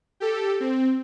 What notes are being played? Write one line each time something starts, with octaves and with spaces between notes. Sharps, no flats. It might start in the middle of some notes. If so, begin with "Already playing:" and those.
G4 A4
C4